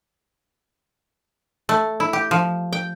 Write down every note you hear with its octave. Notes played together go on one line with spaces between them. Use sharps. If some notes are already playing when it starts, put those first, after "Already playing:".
A3
E4
G4
F3
G5